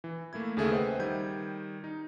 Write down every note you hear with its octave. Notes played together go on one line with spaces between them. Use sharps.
E3
A3 A#3 E4 G#6
D#2 C#3 A3 G#4 A4 E5
B4 C5 D#5 E5 F#5 G5
D#3 G3 G6 G#6
D#4